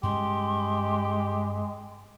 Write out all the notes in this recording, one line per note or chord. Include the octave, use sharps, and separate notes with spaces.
G2 G#3 C4 C#4 G4 C6